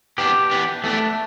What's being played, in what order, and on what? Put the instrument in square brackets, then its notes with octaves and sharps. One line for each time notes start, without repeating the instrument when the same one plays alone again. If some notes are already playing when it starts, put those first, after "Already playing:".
[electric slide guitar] E3 B3 D4 [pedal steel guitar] G4
[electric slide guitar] E3 B3 D4
[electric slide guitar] E3 B3 D4 [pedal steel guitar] A3